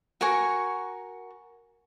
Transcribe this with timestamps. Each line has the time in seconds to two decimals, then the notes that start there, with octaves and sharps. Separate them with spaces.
0.21 F#4 A#4 G#5 C#6